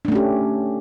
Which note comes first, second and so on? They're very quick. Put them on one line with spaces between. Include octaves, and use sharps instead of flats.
D4 A3 C#4 G4